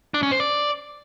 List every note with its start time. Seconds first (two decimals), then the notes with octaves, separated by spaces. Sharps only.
0.14 D4
0.23 C#4
0.31 C5
0.40 D5